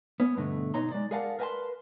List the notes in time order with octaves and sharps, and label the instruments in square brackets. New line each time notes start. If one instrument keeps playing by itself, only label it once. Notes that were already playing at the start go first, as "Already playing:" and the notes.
[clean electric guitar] B3 C#4
G2 B2 D3 A3
B2 D#4 C#5 A#5 C6
G#3 D5
G#4 A#4 D5 F5 F#5 A5
A#4 B4 E5 G#5 A5 C6